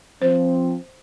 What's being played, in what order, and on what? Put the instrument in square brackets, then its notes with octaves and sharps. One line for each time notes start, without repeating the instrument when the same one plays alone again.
[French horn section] F3 C4 [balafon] C5